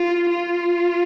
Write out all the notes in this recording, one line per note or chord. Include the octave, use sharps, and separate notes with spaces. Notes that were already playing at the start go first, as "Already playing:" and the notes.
Already playing: F4
F4